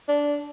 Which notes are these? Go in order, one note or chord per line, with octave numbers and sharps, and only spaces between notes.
D4